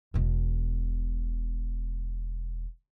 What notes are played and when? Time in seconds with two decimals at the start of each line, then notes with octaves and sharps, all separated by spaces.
0.14 E1 B2